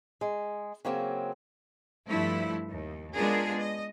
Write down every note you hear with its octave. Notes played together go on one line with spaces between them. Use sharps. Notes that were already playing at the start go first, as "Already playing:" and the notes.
G#3
C#3 F#3 A#3 C4
G2 F3 A3 E4
D#2
G#3 B3 D4 F4 G#4 A#4
D#5